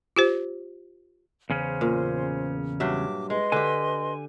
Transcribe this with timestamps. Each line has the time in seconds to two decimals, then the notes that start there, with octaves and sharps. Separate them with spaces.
0.16 F4 G4 C5
1.50 E2 C#3 C#4 C5
1.81 A#2
2.80 G2 F#3 E5 D6
3.30 G#3 B4 D#5 C6
3.52 D3 G4 G#5